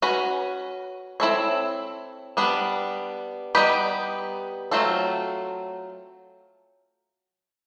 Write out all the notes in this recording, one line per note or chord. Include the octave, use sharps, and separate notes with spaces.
C#4 F#4 B4
C4 E4 A4 C#5
G3 B3 D4
G3 B3 D#4 G4 B4
F#3 A3 C4 F4 A4